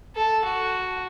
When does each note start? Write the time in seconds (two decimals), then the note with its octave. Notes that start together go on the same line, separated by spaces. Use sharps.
0.16 A4
0.44 F#4